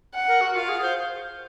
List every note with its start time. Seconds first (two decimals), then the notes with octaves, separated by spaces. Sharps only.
0.15 F#5
0.28 A#4
0.41 F#4
0.55 F4 F5
0.68 G#4
0.82 C5